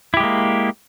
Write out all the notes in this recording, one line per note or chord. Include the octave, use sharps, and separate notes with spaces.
G#3 A#3 E4 G4